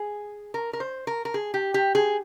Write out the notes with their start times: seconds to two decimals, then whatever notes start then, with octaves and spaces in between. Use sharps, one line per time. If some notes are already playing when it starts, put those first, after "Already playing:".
Already playing: G#4
0.54 A#4
0.73 A#4
0.80 C5
1.07 A#4
1.25 A#4
1.34 G#4
1.54 G4
1.74 G4
1.95 G#4